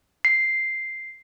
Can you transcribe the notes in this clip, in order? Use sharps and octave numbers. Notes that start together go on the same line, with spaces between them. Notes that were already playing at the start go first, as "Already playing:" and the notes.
C7